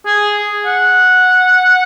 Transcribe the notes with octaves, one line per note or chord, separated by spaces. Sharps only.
G#4
F#5